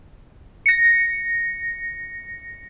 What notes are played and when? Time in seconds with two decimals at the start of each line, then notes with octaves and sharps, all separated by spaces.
0.66 A#6 C#7